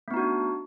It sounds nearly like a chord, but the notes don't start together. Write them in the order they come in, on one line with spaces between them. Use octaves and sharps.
A3 B3 D#4 F#4 D4